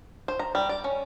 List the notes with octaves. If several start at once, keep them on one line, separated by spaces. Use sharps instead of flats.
C5
A#5
G3
D5
C#4